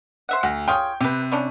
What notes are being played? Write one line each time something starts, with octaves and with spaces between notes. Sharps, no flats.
C5 E5 F#5
D2 F#4
F4 G#4 C#5 G5
C3 G4 B4
G3 C#4 D4